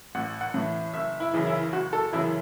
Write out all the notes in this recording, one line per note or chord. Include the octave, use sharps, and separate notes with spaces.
A1 F#5
F#5
A2 E3
F#1 E5
E4
F#2 C#3 E3
E4
F#1 F#4
A4
F#2 C#3 E3 E4